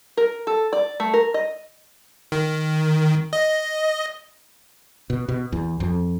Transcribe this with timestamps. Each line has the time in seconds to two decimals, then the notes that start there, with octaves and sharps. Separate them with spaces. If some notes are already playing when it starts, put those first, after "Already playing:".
0.17 A#4
0.47 A4
0.73 D5
1.00 A3
1.14 A#4
1.34 D#5
2.32 D#3
3.33 D#5
5.10 B2
5.29 B2
5.52 E2
5.80 F2